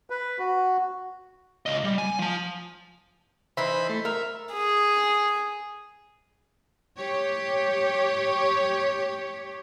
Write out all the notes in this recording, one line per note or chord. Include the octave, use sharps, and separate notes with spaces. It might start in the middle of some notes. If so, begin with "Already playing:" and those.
B4
F#4
C#2 D#5
G3
G#5
F3 A5
E3 D#4 E4 C5 B5
A3
A#4 E5
G#4
G4 C#5